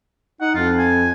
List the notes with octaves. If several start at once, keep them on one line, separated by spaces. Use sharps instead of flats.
D#4 F#5
F2 F4
G#5